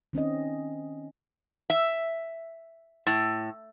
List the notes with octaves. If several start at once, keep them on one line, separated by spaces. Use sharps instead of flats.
D#3 C4 C#4 D#5
E5
A2